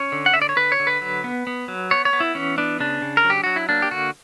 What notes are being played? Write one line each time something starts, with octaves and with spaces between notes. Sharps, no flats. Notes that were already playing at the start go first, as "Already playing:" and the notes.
Already playing: C#4 C#5
D3
F#5
D3 E5
D5
C#5
D3 B4
C#5
D3
B4
F#3
B3
B3
F#3
B3 C#5
C#5
B3
E4
E3 C#4
B3 D4
C#3 D4
C#3
A#4
F#3
G4
F#3 F#4
E4
A#3 D4
G4
D3 F#4